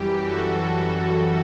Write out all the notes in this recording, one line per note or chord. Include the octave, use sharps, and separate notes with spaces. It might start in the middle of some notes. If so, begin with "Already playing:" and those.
Already playing: F#2 E3 G3 G4
F#2 E3 G3 F#4 A4